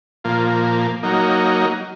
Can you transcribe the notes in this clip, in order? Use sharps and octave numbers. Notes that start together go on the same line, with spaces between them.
A#2 F3 A#3
F#3 A#3 D#4